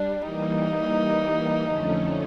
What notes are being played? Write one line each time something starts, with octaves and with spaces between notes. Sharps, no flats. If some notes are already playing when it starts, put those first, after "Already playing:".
Already playing: G3 D4
E3 G3 A#3 D#4
F2 D3 F3 A3 C#4